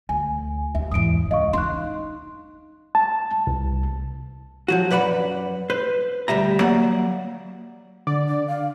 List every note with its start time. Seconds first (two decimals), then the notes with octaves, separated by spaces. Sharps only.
0.09 D2 G#5
0.75 D#2 E5
0.92 G#1 E2 D#6 D7
1.31 C#2 D#5 F5 C#6
1.53 D4 D#4 C6 F#6
2.95 A5
3.47 C2
4.68 F3 F#3 F#4
4.90 F#2 B4 D5 F#5 B5
5.70 B4 C5
6.28 D2 G3 E5 A#5
6.60 F#3 A#3 D5 F#5
8.07 D3 D5
8.28 D4
8.47 F5